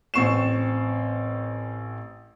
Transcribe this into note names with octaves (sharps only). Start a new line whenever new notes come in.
A1 C4 C#6 C7 E7